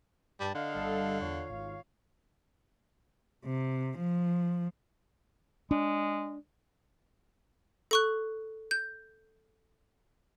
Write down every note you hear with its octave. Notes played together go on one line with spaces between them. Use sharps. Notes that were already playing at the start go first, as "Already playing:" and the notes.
G2 G3 A5
D3 D#5 F5
G1 G3 A4
E2 F4 C#5 F5
G#1
C3
F3
G#3 D4
A4 C#6 F#6
G6